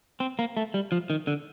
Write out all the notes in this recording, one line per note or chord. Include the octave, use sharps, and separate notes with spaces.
C4
A#3
A3
G3
F3
D#3
D3